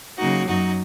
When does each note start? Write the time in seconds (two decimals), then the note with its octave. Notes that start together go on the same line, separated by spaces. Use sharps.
0.18 C#3 F#3 A#3 D#4 F#4
0.46 F#2 F#3 D#4 F#4